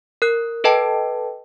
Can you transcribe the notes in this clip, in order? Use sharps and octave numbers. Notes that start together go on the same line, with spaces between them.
A#4 F#6
A4 B4 D#5 G5 A5